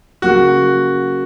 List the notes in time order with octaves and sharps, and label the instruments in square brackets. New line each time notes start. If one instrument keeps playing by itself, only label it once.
[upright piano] C#3 F#3 A#3 [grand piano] F#4